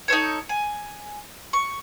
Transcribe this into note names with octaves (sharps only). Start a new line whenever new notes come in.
D#4 A4 C5 C#5
G#5
C#6